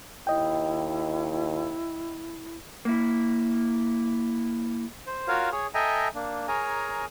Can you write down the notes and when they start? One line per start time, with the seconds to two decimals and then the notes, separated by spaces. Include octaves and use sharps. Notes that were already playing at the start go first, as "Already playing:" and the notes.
0.27 D#2 E4 D#5 G5
2.85 A#3 E4
5.07 C5
5.28 F4 F#4 A#4 C#5 F5
5.52 G#4 C#5
5.74 A4 D#5 E5 G5 G#5 A#5
6.15 A#3 D4
6.48 G#4 A#4 C#5 G#5 A#5